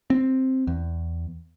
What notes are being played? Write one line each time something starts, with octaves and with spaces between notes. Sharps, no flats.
C4
E2